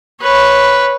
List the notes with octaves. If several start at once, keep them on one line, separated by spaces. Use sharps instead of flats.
B4 C#5